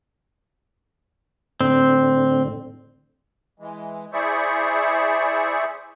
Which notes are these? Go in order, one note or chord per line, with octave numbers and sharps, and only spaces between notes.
A2 D3 C4
E3 G#3
E4 G#4 C5 D5 E5 C#6